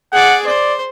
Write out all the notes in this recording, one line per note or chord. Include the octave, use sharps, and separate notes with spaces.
G#4 D5 F#5
C5 D5